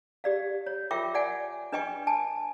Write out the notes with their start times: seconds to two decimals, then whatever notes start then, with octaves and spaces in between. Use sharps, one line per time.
0.24 G4 D5 F5
0.67 C#5
0.91 F4 A#4 E5 G5 C#6 D6
1.14 D5 F#5 G#5
1.72 D4 B4 D#5 G5 G#5 C#6
2.07 G#5 A5